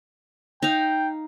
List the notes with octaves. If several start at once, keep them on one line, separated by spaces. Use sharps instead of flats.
D#4 F5 G5